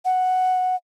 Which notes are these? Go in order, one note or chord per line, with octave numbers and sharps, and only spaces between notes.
F#5